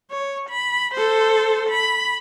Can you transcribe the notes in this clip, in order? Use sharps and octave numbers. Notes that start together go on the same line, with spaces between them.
C#5
B5
A4 C5
B5